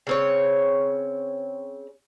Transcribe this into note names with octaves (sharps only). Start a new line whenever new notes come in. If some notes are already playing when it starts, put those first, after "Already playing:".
C#3 C4 C#5